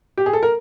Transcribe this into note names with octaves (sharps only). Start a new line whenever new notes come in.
G4
G#4
A4
A#4